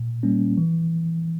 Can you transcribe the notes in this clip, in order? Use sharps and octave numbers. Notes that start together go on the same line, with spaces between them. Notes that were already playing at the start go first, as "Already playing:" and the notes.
Already playing: A#2
G3 A#3 C#4
E3